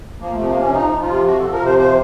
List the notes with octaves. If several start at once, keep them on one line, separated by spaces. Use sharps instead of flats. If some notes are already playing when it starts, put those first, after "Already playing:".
F3 A#3
C3 A3
A#3
F3 C#4
F3 D#4
F3
F4
C3
F3 F#4
F3 A4
A#4
C3 C5
F3 C5